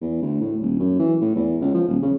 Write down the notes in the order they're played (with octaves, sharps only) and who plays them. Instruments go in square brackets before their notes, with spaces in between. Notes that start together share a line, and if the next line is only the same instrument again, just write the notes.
[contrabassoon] E2
D2
A2
D#1
F#2
E3
A2
E2
C#2
F3
D#1
C#3